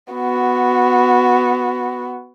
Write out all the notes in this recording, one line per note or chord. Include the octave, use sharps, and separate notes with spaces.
B3 F#4